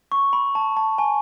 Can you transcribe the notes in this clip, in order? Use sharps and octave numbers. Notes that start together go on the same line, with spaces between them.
C#6
B5
A5
A5
G#5